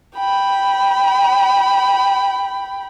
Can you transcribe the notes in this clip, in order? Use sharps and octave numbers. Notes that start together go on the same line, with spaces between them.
G5 B5